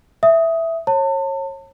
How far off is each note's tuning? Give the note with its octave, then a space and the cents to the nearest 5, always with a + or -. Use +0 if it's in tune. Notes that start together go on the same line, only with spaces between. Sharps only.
E5 +0 D#6 +10
C#5 -30 A5 +35